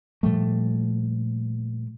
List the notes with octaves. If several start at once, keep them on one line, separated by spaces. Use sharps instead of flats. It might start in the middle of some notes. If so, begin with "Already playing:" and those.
A#2 F3 G3 A3